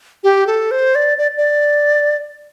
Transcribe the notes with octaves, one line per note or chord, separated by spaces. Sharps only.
G4
A4
C5
D5
D5
D5